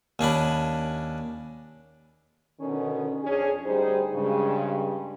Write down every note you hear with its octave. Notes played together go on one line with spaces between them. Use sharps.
D#2 C#4 D4 B5
B2 D3 D#3 C#4
F2 C#4 D4 G#4
D2 G3 D#4 G#4 C5
G2 C#3 G#3